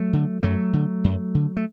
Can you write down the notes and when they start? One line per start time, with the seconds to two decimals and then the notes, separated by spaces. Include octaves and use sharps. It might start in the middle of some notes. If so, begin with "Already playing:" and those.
Already playing: F#3 A3
0.13 D3
0.43 F#2 F#3 A3
0.73 D3
1.04 F#2
1.35 D3
1.57 A3